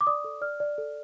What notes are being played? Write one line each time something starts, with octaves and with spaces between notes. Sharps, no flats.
D6
D5 D#6
A4
D5 F6
D5
A4